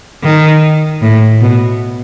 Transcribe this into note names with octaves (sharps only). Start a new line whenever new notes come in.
D#3
A2
B2